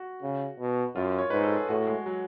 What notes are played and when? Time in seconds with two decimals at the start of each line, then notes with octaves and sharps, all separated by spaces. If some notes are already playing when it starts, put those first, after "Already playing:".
Already playing: F#4
0.22 C#3
0.59 B2
0.96 F#2 F4
1.18 C#5
1.30 G#2 B4
1.43 A4
1.56 G#4
1.68 A2 F#4
1.87 G#3
2.06 F#3